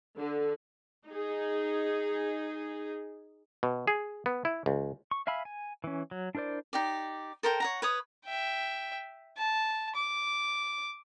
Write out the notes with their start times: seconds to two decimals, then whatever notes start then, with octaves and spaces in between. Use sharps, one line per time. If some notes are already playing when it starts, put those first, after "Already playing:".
0.17 D3
1.07 D#4 G#4
3.63 B2
3.87 G#4
4.26 B3
4.45 E4
4.66 C#2
5.11 C#6
5.27 E5 F5 G#5 B5 E6
5.45 G#5
5.84 E3 C#4
6.11 F#3
6.35 D4 E4 A#4 C5 D5
6.73 D#4 G4 D5
7.43 A4 A#4 C5 G5
7.60 C#5 F#5 A#5
7.82 B4 C#5 D#6
8.25 E5 G5
9.37 A5
9.95 D6